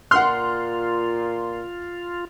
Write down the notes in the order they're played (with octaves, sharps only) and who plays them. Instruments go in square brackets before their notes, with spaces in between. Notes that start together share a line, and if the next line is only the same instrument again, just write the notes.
[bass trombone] A#2 [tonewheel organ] F4 [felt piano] F#5 F6 [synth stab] C6